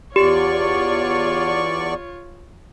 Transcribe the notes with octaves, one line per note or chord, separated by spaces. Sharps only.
E2 F4 G4 C#5 D5 C#6